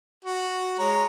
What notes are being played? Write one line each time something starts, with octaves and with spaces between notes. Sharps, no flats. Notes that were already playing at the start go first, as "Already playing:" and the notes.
F#4
G#3 C#5 A#5